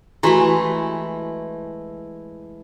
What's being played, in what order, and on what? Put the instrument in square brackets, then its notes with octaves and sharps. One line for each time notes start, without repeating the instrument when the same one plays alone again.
[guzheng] E3 G#3 A3 [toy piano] E4 F#4 G4